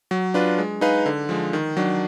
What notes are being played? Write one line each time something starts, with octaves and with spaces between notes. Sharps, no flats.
F#3
D4 F4 B4
G#3
D#4 G#4 B4 F5
D3
F3 G#3
D#3
F#3 D4